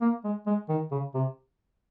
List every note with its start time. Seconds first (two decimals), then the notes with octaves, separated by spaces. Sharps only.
0.01 A#3
0.24 G#3
0.46 G#3
0.69 D#3
0.91 C#3
1.14 C3